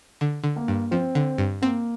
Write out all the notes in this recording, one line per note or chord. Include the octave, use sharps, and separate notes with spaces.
D3
D3
A#3
G2
F3 C4
D3
G2
A#3 C4